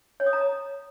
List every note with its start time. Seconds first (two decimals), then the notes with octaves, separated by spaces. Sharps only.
0.20 C#5
0.26 D#6
0.33 A#5